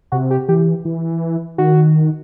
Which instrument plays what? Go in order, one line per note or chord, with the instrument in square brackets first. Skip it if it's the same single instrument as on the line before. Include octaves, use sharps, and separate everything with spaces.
[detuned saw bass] C3 [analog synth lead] F#4
[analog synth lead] G4
[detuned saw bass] E3 [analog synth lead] G4
[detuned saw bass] E3
[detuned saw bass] D#3 [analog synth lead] F#4